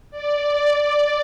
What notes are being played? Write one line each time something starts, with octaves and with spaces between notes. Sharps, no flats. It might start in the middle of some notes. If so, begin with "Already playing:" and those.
D5